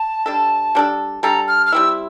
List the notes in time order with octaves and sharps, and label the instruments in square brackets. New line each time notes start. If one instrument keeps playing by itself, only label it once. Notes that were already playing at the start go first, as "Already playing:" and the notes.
Already playing: [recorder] A5
[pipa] G3 D4 A4
G3 D4 A4
[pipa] G3 D4 A4 [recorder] A#5
[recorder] F6
F6
[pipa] G3 C4 E4 [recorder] E6